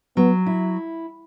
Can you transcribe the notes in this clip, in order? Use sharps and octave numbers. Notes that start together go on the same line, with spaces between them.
F#3 B3
E4